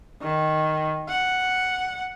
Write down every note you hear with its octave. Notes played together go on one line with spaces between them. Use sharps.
D#3
F#5